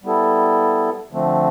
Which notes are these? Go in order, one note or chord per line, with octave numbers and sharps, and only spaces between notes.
G3 B3 E4 A4
D3 F3 A3 C4